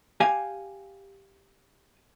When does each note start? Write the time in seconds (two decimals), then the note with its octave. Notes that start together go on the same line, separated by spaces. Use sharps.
0.20 G4 F5 G#5